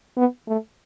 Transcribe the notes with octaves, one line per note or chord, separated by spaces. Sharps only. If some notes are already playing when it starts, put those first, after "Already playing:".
B3
A3